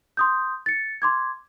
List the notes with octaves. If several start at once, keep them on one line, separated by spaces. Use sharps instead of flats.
C6 D#6 G6
A6 C#7
C6 D6 G#6